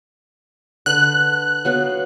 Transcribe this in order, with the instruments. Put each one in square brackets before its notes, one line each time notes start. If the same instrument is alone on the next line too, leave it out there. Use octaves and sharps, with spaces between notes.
[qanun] D3 B4 [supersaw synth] F#6
[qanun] F#3 B3 F5